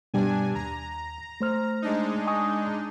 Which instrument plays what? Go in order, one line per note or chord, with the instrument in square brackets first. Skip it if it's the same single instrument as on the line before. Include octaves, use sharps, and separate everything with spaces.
[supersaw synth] G2 D4 G#5 [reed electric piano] B2 G3 G4
[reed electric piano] D#2 [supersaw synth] A#5
[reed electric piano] A3 C5 F6
[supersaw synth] G#3 D4 D#4
[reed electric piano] G#5 C#6 D#6